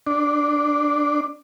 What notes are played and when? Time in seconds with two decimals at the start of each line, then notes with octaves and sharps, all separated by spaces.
0.07 D4